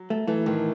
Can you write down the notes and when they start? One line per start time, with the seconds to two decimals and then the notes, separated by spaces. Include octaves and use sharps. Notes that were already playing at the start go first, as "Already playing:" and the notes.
Already playing: F#3
0.10 A3
0.27 E3 A3
0.46 A2 D#3